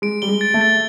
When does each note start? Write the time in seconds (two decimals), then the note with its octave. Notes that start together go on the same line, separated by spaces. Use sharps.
0.02 G#3 D7
0.22 G3 G7
0.28 G#3
0.41 A6
0.54 A3
0.61 A6